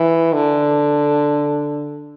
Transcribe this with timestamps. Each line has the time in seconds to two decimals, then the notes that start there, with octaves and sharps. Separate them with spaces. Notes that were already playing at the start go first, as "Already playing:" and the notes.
Already playing: E3
0.33 D3